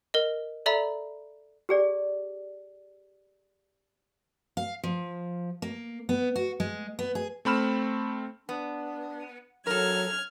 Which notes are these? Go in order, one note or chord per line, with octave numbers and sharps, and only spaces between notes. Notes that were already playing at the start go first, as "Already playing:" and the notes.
A#4 D#5
A4 D5 E5 A#5 B5
G4 G#4 D5
F5
F3
A#3
B3
F#4
G#3
B3
G#4
A3 C4 B5 F6 E7
B3 D4
F#3 A4 A#4 F6 G#6